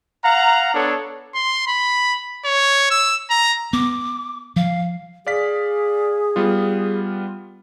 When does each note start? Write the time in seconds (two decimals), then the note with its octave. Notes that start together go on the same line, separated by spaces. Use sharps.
0.24 F5 F#5 A#5
0.74 B3 D4 A4 C#5
1.35 C6
1.68 B5
2.45 C#5
2.91 E6
3.30 A#5
3.73 B3 D6
4.56 F3 F5
5.27 G#4 D5 F5 B6
6.36 G3 B3 F4